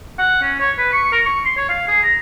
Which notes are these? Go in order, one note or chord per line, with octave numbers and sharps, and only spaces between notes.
F#5
C#4
C#5
B4
C#6
A#4
C#6
C6
C#5
F5
G#4
A#5